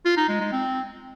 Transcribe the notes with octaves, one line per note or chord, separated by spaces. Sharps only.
F4
D#4
G#3
G#3
C4